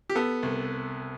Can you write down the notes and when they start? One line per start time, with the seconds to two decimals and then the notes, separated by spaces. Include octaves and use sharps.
0.10 G4
0.15 B3 A4
0.43 C2